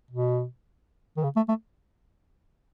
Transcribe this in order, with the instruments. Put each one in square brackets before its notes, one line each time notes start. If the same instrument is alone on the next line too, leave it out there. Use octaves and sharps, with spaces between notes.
[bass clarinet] B2
D#3
C#3
A3
A3